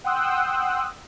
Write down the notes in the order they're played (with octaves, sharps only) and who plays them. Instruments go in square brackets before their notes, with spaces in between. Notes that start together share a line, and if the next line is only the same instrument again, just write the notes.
[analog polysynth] F#5 G5 C6 D#6 E6 F#6